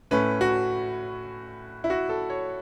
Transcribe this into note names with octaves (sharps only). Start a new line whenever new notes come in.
A2 A3 C#4 B4
F#4
E4
F#4
A4
C#5